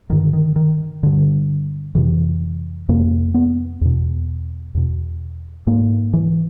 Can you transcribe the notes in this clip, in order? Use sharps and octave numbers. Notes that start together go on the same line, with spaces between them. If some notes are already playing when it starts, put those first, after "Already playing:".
G2 D3 D#3
D#3
D#3
G2 D3
F2 C3 E3
F2 C3 A#3
B3
E2 B2
E2 B2
G#2 A#3
E3